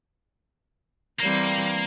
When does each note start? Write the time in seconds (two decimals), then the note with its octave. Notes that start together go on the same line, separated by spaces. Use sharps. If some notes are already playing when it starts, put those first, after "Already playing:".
1.20 E3 G3 A#3 C4